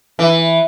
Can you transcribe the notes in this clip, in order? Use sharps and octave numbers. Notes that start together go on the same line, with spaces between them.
E3